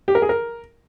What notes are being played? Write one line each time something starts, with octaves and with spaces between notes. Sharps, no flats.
G4
A#4
G#4
A#4